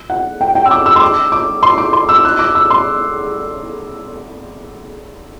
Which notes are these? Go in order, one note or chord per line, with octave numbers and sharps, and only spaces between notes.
F#5
G5
G5
E6
D6
E6
C6
D6
D6
C6
D6
C6
E6
F#6
D6
E6
C6